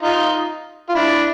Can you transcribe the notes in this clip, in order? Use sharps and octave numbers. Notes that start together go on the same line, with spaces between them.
D#4 F4
F4
D4 E4